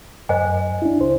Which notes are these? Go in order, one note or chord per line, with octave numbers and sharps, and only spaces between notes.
F#2 C5 D#5 G#5
D4 E4
C#2 C5